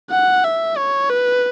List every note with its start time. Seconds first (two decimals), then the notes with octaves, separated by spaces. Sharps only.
0.11 F#5
0.44 E5
0.77 C#5
1.10 B4